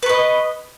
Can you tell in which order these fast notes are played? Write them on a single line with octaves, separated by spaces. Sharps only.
B4 C#6 D#5